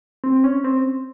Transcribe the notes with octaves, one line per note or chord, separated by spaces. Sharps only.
C4
C#4
C4